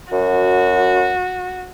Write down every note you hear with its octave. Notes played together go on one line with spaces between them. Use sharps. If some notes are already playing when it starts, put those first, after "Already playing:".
F#2 F#4